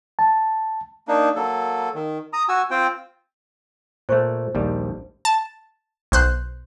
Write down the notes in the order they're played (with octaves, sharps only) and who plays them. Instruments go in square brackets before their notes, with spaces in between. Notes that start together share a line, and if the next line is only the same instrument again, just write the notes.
[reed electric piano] A5
[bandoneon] A#3 D4 D#4
F#3 A#3 A4
D#3
A#5 D#6
F#4 G#5 E6
C4 F4 C5 G5
[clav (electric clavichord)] A#2 A3 [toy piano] C5 C#6
[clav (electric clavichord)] A#1 D#2 G3
[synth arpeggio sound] A5
B1 C5 F#6